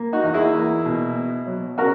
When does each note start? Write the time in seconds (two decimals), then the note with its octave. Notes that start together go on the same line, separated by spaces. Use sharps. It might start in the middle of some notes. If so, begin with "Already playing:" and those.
Already playing: A#3
0.13 D#4 F#4
0.23 E2
0.34 E4 G#4
0.54 A#3
0.85 B2
1.16 B3
1.47 F#3
1.78 C#3 F#4 A#4